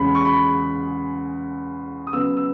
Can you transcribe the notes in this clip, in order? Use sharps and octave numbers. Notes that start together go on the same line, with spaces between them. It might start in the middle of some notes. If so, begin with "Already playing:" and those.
Already playing: E2 C#3 G#3 C#4 B5
C#6
B5
D#6
C#3 F#3 B3 E6
E6